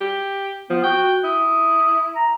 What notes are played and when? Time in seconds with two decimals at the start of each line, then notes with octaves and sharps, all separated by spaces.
0.01 G4
0.70 F3 B3
0.84 F#4 G5
1.24 E4 D#6
2.16 A#5